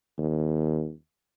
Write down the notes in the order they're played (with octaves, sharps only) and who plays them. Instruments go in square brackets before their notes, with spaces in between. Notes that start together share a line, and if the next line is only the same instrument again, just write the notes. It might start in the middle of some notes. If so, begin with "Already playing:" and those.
[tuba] D#2